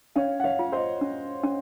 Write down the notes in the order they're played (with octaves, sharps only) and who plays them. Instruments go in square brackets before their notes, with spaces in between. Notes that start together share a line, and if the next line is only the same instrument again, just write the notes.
[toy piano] C#4 [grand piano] C#5 F5
[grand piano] F#5
C#5 F5
[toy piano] F4
[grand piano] C5 D#5
[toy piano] C#4
C#4